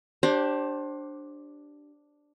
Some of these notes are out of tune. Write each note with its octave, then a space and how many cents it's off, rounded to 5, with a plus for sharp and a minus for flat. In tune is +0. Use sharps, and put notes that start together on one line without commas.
D4 +0 G4 -15 C5 +25